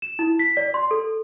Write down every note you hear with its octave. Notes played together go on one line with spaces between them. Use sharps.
E7
E4
B6
D5
C6
A4